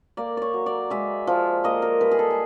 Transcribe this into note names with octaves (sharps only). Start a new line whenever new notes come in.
A#3 D5
C#5 D5
F#3
D5
G#3 E5
F3
A#3 D#5
A#4
G3 B4
G#4
A4
G#4